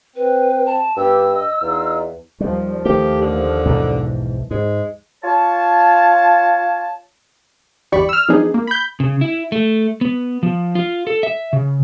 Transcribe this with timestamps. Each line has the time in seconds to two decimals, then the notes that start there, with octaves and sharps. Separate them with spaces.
0.16 C4 B4
0.66 A5
0.97 G2 B3 G4 E6
1.34 D#5
1.62 E2 D#4 F4
2.40 D#2 F3 G3
2.85 D#3 A3 G4
3.21 D3
3.65 B1 G#2 E3
4.51 G#2 G#3
5.24 F4 C#5 A5
7.92 G1 E2 G4 D5 B5 C#6
8.09 E6 F6
8.28 E3 F3 B3 D4 D#4 G#4
8.54 A#3
8.67 B5 G6
9.00 C#3
9.21 E4
9.52 A3
10.01 B3
10.43 F3
10.75 F4
11.07 A4
11.23 E5
11.53 C#3